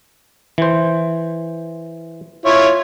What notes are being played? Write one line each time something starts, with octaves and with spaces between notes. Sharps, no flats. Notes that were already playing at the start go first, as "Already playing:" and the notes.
E3 C5
E4 F4 C#5